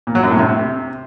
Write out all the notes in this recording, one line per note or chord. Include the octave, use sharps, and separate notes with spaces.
A#2
F#3
F#2
A2
C3